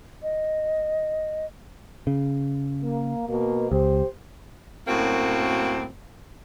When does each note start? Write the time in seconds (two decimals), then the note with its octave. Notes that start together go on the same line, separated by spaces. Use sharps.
0.23 D#5
2.07 C#3
2.83 A#3
3.28 B2 A#3
3.72 C#2 G4 C5
4.88 F#2 A2 A#3 C4 F#4